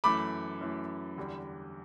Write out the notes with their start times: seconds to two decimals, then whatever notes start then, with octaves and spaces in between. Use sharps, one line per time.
0.04 F#2 E3 A3 B5 D6
0.61 F#2 E3 A3
1.18 E2 D3 G3